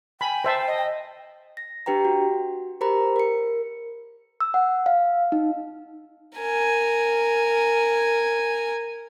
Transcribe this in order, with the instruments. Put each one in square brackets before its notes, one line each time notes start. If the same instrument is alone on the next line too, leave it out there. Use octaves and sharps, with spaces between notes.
[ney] G5 [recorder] G#5 [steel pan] B5
[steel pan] C5 E5 A5
[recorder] D#5
[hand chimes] A#6
D4 G4 B4 G5 A#5
F#4
G4 A#4 C5 A#5 B5
A#4 C#7
E6
F#5
F5
D#4
[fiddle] A#4 G#5